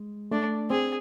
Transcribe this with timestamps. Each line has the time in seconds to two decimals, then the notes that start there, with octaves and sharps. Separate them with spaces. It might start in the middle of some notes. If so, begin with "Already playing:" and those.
Already playing: G#3
0.31 A3 D4
0.70 C4 G#4